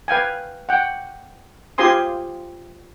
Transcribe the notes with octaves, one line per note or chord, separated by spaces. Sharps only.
B4 F5 G5 G#5
F#5 G5
F4 G4 C5 G#5 C6 D#6